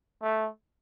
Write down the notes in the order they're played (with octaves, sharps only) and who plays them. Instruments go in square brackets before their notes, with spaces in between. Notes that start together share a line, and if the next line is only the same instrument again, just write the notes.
[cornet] A3